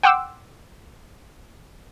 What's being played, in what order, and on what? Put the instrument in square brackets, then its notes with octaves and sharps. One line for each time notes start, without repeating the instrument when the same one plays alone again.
[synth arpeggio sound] F#5 G5 C6 D6 E6